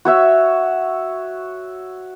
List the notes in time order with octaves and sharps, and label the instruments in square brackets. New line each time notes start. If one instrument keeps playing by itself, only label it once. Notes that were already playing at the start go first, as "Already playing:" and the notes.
[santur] F#4 C#5 E5